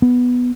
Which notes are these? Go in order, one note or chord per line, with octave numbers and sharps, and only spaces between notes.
B3